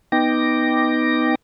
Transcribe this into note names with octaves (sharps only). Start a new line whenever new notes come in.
B3 D#4 G5 D6 A#6